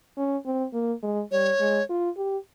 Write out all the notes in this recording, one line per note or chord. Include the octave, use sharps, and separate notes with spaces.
C#4
C4
A#3
G#3
G3 C#5
G#3
F4
G4